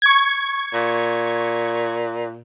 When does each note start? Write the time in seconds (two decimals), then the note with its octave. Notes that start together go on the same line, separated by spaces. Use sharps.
0.02 C#6 G#6
0.74 A#2